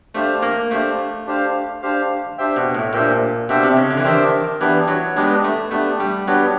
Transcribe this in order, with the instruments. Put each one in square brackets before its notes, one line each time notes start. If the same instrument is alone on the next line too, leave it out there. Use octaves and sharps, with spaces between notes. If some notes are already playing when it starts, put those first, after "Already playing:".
[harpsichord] A3 [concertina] D4 G4 C5 F5
[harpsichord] A#3
[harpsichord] A3 [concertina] D4 G4 C5 F5
[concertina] D4 G4 C5 F5
D4 G4 C5 F5
D4 G4 C5 E5 G5
[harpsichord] B2
A2
[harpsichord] A#2 [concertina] D4 G4 C5 E5 G5
[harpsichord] B2 [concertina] D4 G4 C5 E5 G5
[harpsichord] C3
C#3
D3
E3
[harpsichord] D#3 [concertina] D4 G4 C5 E5 G5
[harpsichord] E3 [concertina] B3 D4 G4 B4
[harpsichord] F#3
[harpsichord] G#3 [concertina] B3 D4 G4 B4
[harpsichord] A3
[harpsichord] A3 [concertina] B3 D4 G4 B4
[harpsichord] G3
[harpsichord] F#3 [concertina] B3 D4 G4 B4